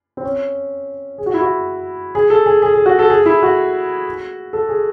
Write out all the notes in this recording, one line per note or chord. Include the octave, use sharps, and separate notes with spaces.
C4
C#4
G#4
F#4
E4
F#4
G#4
A4
G#4
G#4
G#4
F#4
A4
G#4
E4
F#4
A4
G#4